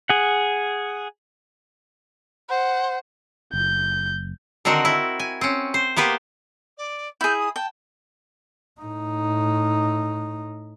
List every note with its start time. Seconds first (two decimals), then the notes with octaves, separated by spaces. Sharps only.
0.09 G#4 F#5
2.50 C5 F#5
3.53 F#1 G6
4.65 D3 D#3 C4 F#4 A#4
4.85 E4
5.20 G#5
5.41 C4 C#4
5.74 C5
5.97 A#3 B3 G4 B4 C5
6.77 D5
7.21 E4 G#4 G6
7.39 D#6
7.56 G5 A5
8.81 A2 D#4